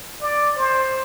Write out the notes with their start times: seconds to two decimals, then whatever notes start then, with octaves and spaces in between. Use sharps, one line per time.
0.21 D5
0.57 C5